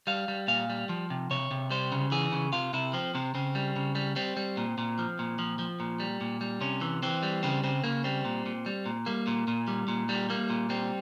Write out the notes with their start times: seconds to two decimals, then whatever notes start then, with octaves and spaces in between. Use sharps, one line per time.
0.07 G3 F5
0.28 G3
0.48 A#2 F5
0.70 G3
0.89 F3
1.10 C3
1.31 C3 C#5
1.51 C3
1.71 G3 C5
1.92 C#3
2.11 E3 G#4
2.32 C#3
2.53 C3 F4
2.73 C3 E4
2.93 F3 C4
3.15 C3 C4
3.35 C#3 C4
3.55 G3
3.76 C#3
3.95 G3
4.16 G3 C4
4.37 G3
4.57 A#2
4.78 A#2
4.99 F3
5.19 A#2
5.39 F3
5.59 F3
5.80 A#2
6.00 G3
6.21 A#2
6.41 G3
6.61 C3 C#4
6.81 E3
7.03 E3 C4
7.23 G3
7.43 C#3 C4
7.64 C#3 C4
7.84 C#3 A#3
8.04 G3 C4
8.25 A#2
8.46 A#2
8.66 G3
8.86 A#2
9.06 G3 A#3
9.27 A#2
9.48 A#2
9.67 G3
9.88 A#2
10.09 G3
10.30 G3 A#3
10.50 A#2
10.70 G3 C4